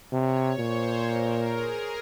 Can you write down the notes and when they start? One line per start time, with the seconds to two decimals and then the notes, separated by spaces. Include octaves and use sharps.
0.13 C3 C#5
0.58 A#2 C5
1.04 A#4
1.49 G#4